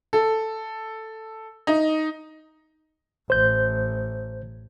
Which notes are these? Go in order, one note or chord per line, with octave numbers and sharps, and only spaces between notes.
A4
D#4
A1 C5 G6